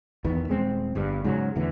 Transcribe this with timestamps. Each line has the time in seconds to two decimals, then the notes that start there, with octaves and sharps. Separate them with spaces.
0.24 E2 D#3 B3
0.48 D#1 G#3 C4
0.95 G1 G2
1.24 G#2 C#3 F#3
1.55 E2 A2 D3 E3